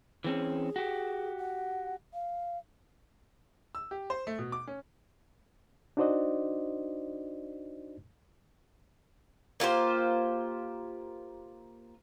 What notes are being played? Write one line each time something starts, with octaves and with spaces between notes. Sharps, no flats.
E3 C4 C#4 G#4
F#4 G4
F#5
F5
E6
G4
C5
A3
B2
D6
C#4
D4 D#4 F#4 C5 D5 D#5
A#3 F4 G4 C5